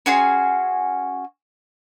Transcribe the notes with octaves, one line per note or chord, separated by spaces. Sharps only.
C#4 F#4 G#4 C6